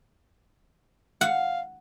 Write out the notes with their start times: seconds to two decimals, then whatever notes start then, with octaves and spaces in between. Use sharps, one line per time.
1.21 F5 F#5